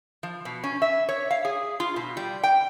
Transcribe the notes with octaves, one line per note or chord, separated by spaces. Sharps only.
F3
B2
C#4
E5
C#5
F5
G#4
F4
B2
G3
G5